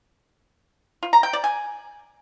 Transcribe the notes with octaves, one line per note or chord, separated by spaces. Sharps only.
F4
A#5
G5
D5
G#5